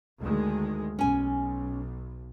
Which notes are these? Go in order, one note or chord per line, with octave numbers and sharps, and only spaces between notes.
D2 D#3 G#3
B1 C#4 G#5